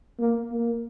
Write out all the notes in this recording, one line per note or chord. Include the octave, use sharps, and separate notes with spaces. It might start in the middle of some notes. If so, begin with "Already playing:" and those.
A#3
A#3